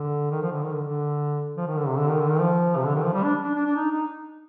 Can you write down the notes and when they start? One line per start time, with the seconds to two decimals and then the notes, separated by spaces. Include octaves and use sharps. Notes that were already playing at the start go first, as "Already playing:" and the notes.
Already playing: D3
0.31 D#3
0.42 F3
0.52 D3
0.63 D#3
0.73 D3
0.83 D3
1.57 F3
1.67 D#3
1.77 D3
1.88 C3
1.98 D3
2.09 D#3
2.19 D3
2.29 D#3
2.40 F3
2.77 C3
2.85 D3
2.96 D#3
3.04 F3
3.13 G3
3.24 D4
3.44 D4
3.55 D4
3.66 D4
3.76 D#4
3.91 D#4